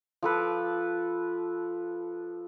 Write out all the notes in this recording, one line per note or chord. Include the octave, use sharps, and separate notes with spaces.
F3 A4 B4 D6